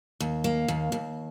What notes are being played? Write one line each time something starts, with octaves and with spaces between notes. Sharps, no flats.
D#2
A#3
D#2
D#2